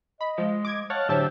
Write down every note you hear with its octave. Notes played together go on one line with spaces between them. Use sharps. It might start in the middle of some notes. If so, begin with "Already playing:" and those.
D#5 B5
F3 G#3
D6 G#6
C#5 F5 F#5 A5
A2 D3 F#3 G4 C5 C#5 E5 A5